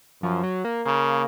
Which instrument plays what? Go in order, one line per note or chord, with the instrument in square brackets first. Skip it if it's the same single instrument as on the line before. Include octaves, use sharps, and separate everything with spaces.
[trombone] F#2 [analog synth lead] F3
[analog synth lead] F#3
A#3
[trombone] C#3 [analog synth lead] A#3